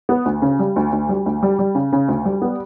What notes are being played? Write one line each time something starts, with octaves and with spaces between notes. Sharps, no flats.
B3
D2
C#3
G3
D2
D2
G3
D2
G3
G3
C#3
C#3
D2
G3
B3